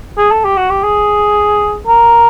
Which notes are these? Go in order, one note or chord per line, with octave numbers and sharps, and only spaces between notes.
G#4
A4
G4
F#4
G4
G#4
A#4